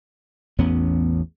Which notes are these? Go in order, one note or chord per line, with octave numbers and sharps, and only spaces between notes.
A1 E2 B3 C#4